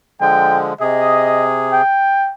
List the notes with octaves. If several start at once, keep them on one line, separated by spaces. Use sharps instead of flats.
D3 F3 G#3 G5
C3 G#4 D#5
G5